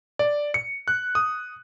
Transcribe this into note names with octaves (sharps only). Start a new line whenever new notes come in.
D5
C#7
F#6
D#6